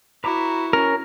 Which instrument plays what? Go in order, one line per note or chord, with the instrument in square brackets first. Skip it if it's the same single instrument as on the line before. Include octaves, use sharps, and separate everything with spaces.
[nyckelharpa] E4 F#4 [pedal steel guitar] B4 A#5 D6
[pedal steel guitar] C#4 [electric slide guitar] A#4